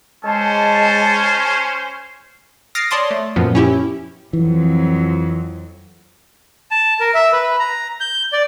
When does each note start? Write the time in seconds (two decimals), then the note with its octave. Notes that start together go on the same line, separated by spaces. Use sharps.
0.24 G#3 C#4 C5 A5
2.75 D#6 F6 A6 A#6 C7 D7
2.91 C#5 D5 A5 C6 D6 D#6
3.11 A3
3.36 F#2 A#2 F3 B3
3.55 C#4 E4 G4
4.33 F2 E3 F#3
6.71 A5
7.00 A#4
7.14 E5
7.32 B4
7.59 A#5
8.00 G6
8.33 D5